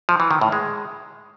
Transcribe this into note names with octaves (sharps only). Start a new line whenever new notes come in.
F3
E3
D#3
A2
G#3